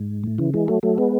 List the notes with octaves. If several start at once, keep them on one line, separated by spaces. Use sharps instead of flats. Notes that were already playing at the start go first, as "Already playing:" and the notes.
Already playing: G#2
A2
C#3 E3
E3 G#3
F#3 A3
F#3 A3
G#3 B3